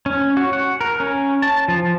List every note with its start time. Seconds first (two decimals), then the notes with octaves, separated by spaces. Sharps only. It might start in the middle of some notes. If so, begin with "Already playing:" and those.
0.06 C#4
0.37 F#4
0.53 F#5
0.81 A#4
1.00 C#4
1.42 A5
1.68 F3